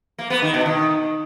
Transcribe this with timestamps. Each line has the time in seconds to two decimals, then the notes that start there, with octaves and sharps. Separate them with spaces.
0.18 A#3
0.30 B3
0.42 D#3
0.54 B2
0.66 D#3